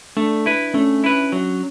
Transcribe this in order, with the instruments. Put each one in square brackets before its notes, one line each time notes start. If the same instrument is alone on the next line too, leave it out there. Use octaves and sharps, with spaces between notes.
[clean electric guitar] A3 [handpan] D4
[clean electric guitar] E4 B4
[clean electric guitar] A3 [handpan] C#4
[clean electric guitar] E4 B4
F#3